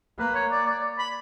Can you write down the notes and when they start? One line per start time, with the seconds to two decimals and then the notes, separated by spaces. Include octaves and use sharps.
0.19 A#3 B4
0.35 C#5
0.51 D5
0.67 D5
0.99 B5